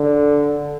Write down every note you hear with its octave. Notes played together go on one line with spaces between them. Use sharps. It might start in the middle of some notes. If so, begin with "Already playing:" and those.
Already playing: D3